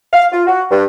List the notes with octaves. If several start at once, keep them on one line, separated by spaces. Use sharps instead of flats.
F5
F4
F#4
G2